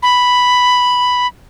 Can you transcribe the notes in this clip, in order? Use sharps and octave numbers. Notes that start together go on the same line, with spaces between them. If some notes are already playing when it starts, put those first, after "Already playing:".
B5